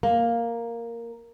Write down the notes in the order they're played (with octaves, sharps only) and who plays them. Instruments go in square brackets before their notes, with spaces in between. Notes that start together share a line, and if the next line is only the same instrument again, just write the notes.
[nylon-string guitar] A#3